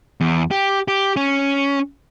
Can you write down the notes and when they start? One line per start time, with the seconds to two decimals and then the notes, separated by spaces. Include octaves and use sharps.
0.21 E2
0.51 G4
0.88 G4
1.16 C#4